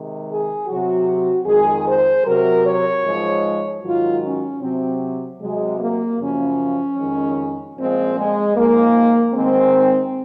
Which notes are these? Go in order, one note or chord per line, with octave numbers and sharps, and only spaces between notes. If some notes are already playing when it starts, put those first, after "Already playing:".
Already playing: C3 D#3 G#3
G#4
C3 F#3 F#4
F2 D#3 G#3 G#4
C5
C3 F#3 A#4
C#5
G#2 F3 G#3
G#2 D#3 F#3 F4
C#4
C3 F#3 C4
C3 F#3 G#3
A#3
F#2 C#3 F3 C#4
F2 D#3 G#3
A#2 F3 G#3 C4
G#3
G#2 F3 G#3 A#3
G#2 D#3 G#3 C4